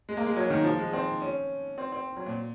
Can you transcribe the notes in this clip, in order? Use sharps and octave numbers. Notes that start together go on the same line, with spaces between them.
G#3
A#3
G#3
F#3
D#3
F3
G#3
C4
C#4
C4
C4
F#3
A#2